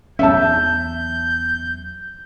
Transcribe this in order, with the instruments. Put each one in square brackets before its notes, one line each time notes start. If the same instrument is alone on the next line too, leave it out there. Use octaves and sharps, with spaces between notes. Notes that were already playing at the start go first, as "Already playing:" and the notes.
[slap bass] E2 F#3 C#4 [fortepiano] E5 A5 [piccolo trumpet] G6